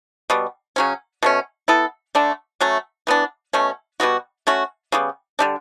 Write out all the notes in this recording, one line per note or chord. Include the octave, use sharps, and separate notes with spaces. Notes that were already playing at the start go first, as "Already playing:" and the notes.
B2 G3 B3
C#3 F#3 C#4
B2 A3 C#4
B3 E4 A4
D3 A3 D4
F#3 A3 C#4
E3 B3 D4
B2 A3 C#4
B2 G3 B3 F#4
A3 C#4 F#4
C#3 G3 B3
D3 G3 D4